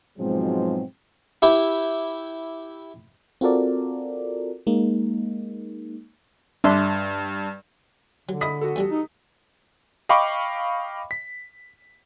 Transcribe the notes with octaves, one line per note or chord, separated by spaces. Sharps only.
G#2 B2 F3 F#3 G#3 C4
E4 G4
C4 F4 F#4 A4 A#4 D5
G#3 A#3 D#4
G2 D4 E5 C6
D3 F#3
D4 E4 D#5 B5 D#6 B6
F#4 A4
E2 G3 D4
D#4
D#5 F5 G5 B5 C#6 D6
B6